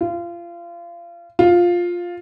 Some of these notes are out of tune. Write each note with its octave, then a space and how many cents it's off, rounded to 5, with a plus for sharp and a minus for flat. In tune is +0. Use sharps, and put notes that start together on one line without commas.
F4 -30
F4 +5